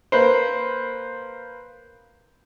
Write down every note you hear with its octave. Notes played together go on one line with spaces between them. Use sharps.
A#3 B4 C5